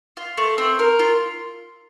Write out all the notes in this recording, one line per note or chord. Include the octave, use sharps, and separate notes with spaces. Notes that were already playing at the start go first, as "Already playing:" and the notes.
F4
A3
C4
A#4
F4